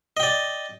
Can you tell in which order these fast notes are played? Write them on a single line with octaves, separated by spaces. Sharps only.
D#5 G5 D5